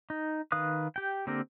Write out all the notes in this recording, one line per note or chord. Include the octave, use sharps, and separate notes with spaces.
D#4
D#3 B4 F5 D#6 F#6
G4 G5
D3 A#3 C4 G4 A#4